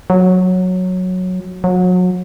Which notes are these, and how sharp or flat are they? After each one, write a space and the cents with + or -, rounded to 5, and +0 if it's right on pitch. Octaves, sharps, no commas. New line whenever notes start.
F#3 -10
F#3 -30